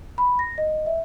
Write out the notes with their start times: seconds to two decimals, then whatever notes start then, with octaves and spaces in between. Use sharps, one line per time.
0.18 B5
0.39 A#6
0.58 D#5
0.86 E5